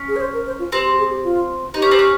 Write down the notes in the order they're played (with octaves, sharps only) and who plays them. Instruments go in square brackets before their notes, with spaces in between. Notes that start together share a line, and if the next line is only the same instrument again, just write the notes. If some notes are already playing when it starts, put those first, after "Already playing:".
Already playing: [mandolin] C#4
[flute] G#4
C#5
C5
A#4
C5
F4
[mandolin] C4 [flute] G4
[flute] G4
G#4
G4
F4
[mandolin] D#4 [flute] G4
[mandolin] C#4
C4
C#4